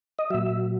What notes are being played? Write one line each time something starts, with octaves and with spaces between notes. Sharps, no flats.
D#5
A#2 F#3 E5